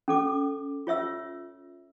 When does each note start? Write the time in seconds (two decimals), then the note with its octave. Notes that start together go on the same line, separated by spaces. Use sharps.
0.08 C#4 A4 D6
0.87 F4 C#5 E5 E6